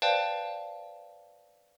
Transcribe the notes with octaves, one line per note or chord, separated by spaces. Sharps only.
B4 C5 D5 F5 G5 A5